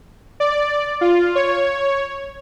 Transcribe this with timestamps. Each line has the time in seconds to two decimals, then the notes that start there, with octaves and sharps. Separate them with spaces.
0.40 D5
1.01 F4
1.35 C#5